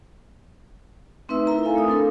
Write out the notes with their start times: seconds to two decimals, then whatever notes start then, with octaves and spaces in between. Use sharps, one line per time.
1.29 A3 C4 D#4 B4 E5 E6
1.47 E4 A#4 E5 A#5
1.63 E4 A4 F5 G#5
1.75 A3 D#6
1.87 C4 D4 A4 A#4